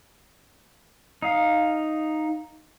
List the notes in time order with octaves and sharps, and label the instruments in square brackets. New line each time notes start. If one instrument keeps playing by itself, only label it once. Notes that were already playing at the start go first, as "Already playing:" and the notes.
[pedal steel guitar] D#4 F5